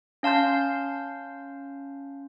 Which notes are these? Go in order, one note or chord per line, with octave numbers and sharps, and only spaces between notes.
C#4 F5 A5 C6 G6